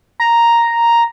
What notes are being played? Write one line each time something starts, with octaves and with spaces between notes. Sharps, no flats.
A#5